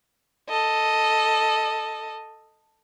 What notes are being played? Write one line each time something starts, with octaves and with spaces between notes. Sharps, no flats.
A4 D#5